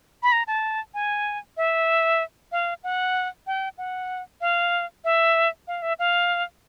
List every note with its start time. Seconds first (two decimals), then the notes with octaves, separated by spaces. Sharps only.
0.23 B5
0.32 A#5
0.47 A5
0.94 G#5
1.57 E5
2.52 F5
2.84 F#5
3.47 G5
3.78 F#5
4.41 F5
5.04 E5
5.68 F5
5.82 E5
5.99 F5